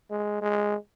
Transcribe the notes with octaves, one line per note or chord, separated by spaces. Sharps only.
G#3
G#3